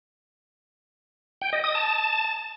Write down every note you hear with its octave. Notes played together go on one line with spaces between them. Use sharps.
G5
D#5
D#6
A5